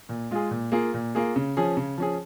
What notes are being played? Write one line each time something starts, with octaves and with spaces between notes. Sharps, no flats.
A#2
G#3 F4 G#4
A#2
A#3 F4 G#4
A#2
A#3 F4 G#4
C#3
F3 C#4 G#4
C#3
F3 C#4 G#4